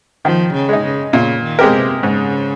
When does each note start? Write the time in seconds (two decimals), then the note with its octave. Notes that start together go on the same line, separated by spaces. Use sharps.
0.25 D#3 F3
0.53 C#3
0.69 G#3 D#4
0.84 C#3
1.13 A#2 C#3
1.43 D#3
1.59 G#3 C4 G4 A#4
1.74 C3
2.03 G#2 C#3